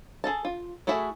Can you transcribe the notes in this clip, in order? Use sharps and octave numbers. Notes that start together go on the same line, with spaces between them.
G#4 A4 A5
F4
A3 E4 F#4 G#4 E5